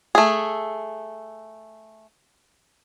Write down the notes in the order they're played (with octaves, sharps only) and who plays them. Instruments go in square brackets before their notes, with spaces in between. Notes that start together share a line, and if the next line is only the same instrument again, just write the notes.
[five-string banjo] A3 G#4